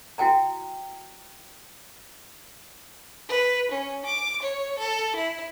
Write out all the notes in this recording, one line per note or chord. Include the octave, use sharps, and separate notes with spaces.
E4 F#4 G5 G#5 A#5
B4
C#4
D6
C#5
A4
E4